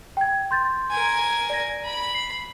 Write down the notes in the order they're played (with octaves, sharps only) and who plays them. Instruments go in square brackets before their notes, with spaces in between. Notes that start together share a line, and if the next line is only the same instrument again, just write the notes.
[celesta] G5 G#6
C6 G6 A6
[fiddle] A#4 G#5
[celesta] D5 A#6
[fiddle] B5
[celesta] C7